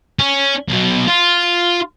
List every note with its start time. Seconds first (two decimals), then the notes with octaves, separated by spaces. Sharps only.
0.19 C#4
0.69 B1 B2
1.08 F4